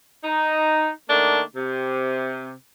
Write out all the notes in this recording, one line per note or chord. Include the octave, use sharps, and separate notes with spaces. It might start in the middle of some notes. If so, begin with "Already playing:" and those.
D#4
D#3 A3 A#3 D4
C3